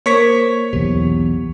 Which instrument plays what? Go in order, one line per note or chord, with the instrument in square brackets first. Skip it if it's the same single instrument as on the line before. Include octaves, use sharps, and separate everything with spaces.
[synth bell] A#3 A#4 C5 [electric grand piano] C#5 C#6 B6
[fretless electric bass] B1 E2 [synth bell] G4